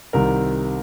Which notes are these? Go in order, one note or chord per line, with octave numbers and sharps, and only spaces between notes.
C2 C3 D#3 A#4